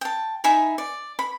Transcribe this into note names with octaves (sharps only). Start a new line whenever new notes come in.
G5 A5
D#4 E5 G#5 B5
D5
B5